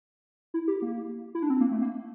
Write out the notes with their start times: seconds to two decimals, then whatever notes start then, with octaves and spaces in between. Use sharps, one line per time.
0.54 E4
0.68 G4
0.82 A#3
1.35 E4
1.42 D4
1.50 C4
1.61 A#3
1.71 A3
1.82 A#3